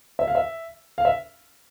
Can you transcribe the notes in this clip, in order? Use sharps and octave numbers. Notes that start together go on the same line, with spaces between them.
E5
F5
E5
F5
E5